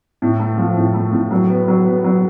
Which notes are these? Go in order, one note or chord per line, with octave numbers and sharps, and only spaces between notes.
A2
A3
F3
A2
A3
A2
F#3
B3
F#3
B3
F#3